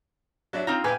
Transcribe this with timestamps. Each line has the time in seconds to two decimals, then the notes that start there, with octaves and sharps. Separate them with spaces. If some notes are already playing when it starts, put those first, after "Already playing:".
0.53 F#3 D4 E4
0.67 C4 D#4 F4 A#5
0.84 A#2 B4 G5 G#5